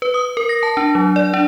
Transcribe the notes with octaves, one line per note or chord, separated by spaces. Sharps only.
B4
D#6
A#4
A#6
A5
D4
F#3
D5
D4